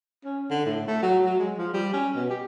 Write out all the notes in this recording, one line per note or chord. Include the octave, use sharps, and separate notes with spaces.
C#4
D3
A2
A3
F#3
F#3
G#3
F3
G3
C#4
B2
G4